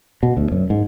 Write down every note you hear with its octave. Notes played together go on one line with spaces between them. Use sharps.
B2
D2
F#2
G#2